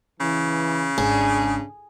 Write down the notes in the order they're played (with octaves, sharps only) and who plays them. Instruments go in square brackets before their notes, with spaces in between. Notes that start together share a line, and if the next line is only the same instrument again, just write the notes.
[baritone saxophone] C#3 [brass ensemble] E3
[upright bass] G#1 [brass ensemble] D4 [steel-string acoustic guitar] G#4